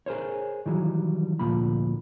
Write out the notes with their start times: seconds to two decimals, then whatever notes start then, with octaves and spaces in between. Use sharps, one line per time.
0.06 G#4 A#4 C5 C#5
0.66 D#3 E3 F#3 G3
1.39 D2 A#2 F3 B5